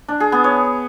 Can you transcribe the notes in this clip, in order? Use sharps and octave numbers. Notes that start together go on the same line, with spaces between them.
D4
G#4
B3
C#5